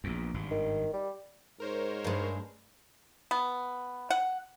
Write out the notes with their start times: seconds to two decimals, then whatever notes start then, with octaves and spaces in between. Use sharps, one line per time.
0.04 A#1 E2
0.34 G#1 G2
0.51 D#3
0.93 G3
1.60 G#2 A#4 C5 C#5
2.04 G2 G#3
3.31 B3
4.10 F#5